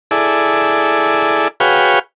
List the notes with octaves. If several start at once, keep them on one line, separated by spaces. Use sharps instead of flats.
E4 G#4 A4 D5
F#4 G#4 B4 C#5 F5 G5